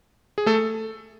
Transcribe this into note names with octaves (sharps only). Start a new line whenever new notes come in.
G#4
A3 A4